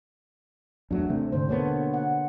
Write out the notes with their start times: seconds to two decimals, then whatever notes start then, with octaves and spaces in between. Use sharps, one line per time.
0.91 E2 F#3 A3 D4
1.10 C3 A3 C4
1.32 G#2 D3 C5
1.49 B2 A#3 B3 A4 C#5
1.94 F#5